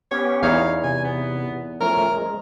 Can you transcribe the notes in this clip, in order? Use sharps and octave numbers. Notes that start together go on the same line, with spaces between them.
B3 C#4 G4 C#5
E2 D#4 C#5 F5
C3 G#5
B3
F3 A3 C#4 A#4
G#3